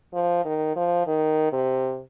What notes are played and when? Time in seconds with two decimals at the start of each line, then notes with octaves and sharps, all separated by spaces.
0.13 F3
0.45 D#3
0.76 F3
1.07 D#3
1.52 C3